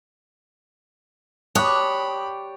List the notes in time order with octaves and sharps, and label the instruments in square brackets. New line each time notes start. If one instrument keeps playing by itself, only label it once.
[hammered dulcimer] G4 D5 G5 [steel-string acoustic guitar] C#5 [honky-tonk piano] A5 D#6 F#6 [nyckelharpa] B5